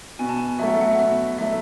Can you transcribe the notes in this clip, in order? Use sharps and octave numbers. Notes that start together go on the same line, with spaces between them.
B2 G#5
A5
G#5
F#3 A3 E5 F#5
E5
F#5
E5
B2 E5
F#3 A3 E5